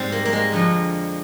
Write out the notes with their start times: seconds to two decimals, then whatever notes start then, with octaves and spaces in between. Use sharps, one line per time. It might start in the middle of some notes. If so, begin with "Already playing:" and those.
Already playing: G#2 G3 C4
0.12 A#3
0.25 A#3
0.33 G#3
0.52 F2 D3 F3